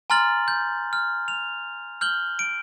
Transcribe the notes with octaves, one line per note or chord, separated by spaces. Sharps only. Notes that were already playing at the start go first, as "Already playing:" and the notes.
G#5 A#5 C6 F6 A6 F#7
G6
F6
F7
F6 G6 F#7 G7
D7